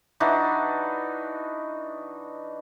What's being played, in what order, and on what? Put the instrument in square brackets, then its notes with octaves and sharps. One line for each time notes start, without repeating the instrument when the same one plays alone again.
[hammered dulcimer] E3 D4 D#4 F#4